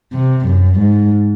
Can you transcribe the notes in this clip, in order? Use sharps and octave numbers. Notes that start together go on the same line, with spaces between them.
C3
F#2
G#2